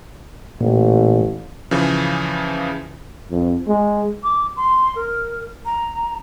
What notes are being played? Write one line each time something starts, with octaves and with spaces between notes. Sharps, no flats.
A1 A#2
C#3 E3 F3
F2
G#3
D6
C6
A#4
A#5